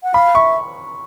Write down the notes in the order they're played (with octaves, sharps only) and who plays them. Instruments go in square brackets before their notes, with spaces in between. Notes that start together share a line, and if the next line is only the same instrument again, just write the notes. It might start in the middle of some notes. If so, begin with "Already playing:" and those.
[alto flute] F#5
[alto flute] F5 [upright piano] B5
[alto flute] E5 [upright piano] C#6